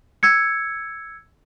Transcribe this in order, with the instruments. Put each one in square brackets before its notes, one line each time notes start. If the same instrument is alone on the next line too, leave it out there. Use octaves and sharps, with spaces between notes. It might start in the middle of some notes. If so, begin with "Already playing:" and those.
[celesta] E6 G#6 C#7